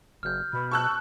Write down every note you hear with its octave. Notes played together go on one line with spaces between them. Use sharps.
F#1 F6 G6
B2 B5
A5 C#6 E6 F#6